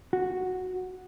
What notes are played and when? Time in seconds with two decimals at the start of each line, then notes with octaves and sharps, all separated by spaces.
0.13 F#4